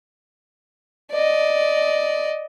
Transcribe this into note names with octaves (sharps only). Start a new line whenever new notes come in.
D5 D#5